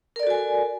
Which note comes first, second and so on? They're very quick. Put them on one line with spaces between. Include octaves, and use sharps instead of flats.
A#4 D5 A4 F#4 G#5